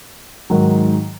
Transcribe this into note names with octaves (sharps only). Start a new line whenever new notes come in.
G#2 D#3 F#3